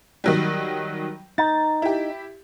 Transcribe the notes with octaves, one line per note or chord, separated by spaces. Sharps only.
D#3 F#3 G3
D#4 A6
E4 G4